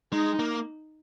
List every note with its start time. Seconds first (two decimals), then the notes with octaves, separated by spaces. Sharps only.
0.12 G#3 D#4
0.39 A#3